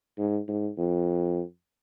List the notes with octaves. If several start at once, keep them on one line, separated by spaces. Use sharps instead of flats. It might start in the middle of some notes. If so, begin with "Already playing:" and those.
G#2
G#2
F2